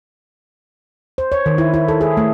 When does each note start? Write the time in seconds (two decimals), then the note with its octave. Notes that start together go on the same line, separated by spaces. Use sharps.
1.18 C5
1.32 C#5
1.46 D#3
1.58 E4
1.74 E4
1.88 A4
2.01 G#4
2.17 A3